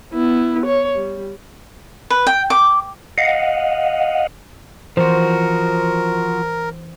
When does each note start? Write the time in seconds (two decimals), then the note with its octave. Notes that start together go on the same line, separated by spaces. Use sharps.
0.14 B3 E4
0.66 C#5
0.96 G3
2.10 B4
2.27 G5
2.50 D6
3.18 D#5 F5 F#5
4.97 E3 F3 F#4 A#4 C5